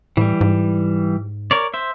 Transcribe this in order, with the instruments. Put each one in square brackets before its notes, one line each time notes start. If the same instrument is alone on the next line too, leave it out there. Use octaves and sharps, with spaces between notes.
[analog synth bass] A2 [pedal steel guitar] E3 G3
[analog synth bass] G#2
[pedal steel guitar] A#4 C#5 D5
C5 E5